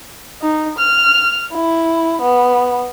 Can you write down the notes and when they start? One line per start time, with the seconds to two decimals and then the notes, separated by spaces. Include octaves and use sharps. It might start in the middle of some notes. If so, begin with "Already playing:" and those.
0.42 D#4
0.78 F6
1.52 E4
2.22 B3